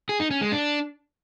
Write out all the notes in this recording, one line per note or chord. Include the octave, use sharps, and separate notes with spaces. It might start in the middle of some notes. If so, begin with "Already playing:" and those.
G#4
D#4
C#4
G#3
D4